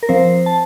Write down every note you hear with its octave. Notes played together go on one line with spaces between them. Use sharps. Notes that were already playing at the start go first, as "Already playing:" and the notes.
A#4
F3 C4 C5
A5